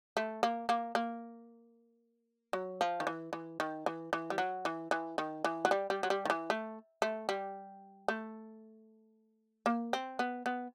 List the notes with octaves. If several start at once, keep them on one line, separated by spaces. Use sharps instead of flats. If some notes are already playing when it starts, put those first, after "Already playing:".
A3
A#3
A#3
A#3
F#3
F3
D#3
E3
E3
D#3
E3
E3
G3
F#3
E3
E3
D#3
E3
F#3
G3
G3
F#3
G3
D#3
E3
A3
A3
G3
A3
A#3
C4
B3
B3